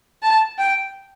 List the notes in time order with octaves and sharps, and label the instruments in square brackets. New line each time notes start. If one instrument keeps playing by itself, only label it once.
[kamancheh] A5
G5